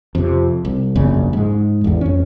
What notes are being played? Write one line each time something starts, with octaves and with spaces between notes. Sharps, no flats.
F2 C3
C2
E1 A#1 F#2 C#3
G#2 G#3
A1 E2
F2 C#4